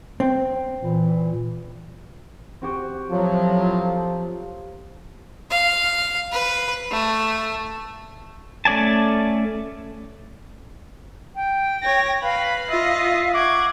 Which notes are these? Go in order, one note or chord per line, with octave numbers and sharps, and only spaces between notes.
C4
A#2 E3
C4 F#4 G4
A2 F3 F#3
F5
B4
A3
A3 C#4 D5 G#5 A5
G5
C#5 A#6
B4 F5 B5
F4 D#5 E5
F#5 C#6 D6 G#6